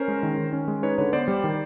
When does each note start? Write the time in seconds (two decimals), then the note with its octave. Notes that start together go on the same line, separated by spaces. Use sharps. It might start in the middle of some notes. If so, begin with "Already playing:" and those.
Already playing: C#4 A#4 C5
0.08 G#3
0.23 D#3
0.38 D#3
0.53 C#4
0.68 G#3
0.83 D#4 B4 C#5
0.98 D3 B4 C#5
1.13 B3 C5 D5
1.28 G3
1.44 D#3